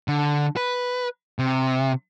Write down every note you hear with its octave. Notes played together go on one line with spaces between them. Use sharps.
D3
B4
C3